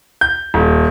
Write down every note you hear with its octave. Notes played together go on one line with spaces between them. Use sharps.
G6
D#1